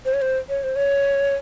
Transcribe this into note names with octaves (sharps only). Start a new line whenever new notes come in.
C5
C#5
C5
C#5
C5
C#5